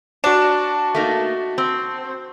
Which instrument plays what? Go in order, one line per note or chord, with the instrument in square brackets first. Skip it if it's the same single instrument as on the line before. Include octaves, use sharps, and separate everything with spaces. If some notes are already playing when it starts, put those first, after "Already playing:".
[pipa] D4 [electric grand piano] F#4 A5 E7
[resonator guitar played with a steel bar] A3 A#3 D#4
C4